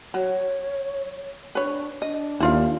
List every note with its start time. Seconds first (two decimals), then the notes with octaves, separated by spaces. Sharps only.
0.14 F#3 C#5
1.55 D4 B4 C#5
2.02 D4 D#5
2.40 D#2 E4 F4 F5